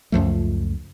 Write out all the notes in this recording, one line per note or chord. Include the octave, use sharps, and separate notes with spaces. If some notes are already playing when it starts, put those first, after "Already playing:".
C#2 F#2 F3 A3